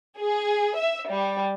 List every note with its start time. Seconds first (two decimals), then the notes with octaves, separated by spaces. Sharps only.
0.20 G#4
0.77 E5
1.09 G3